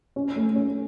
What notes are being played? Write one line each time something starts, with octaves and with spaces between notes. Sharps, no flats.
C#4
A3
C#4